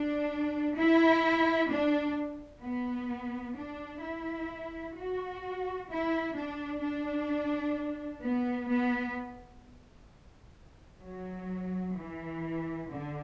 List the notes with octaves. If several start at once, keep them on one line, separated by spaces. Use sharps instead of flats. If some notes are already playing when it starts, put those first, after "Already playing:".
Already playing: D4
E4
D4
B3
D4
E4
F#4
E4
D4
D4
B3
B3
F#3
E3
D3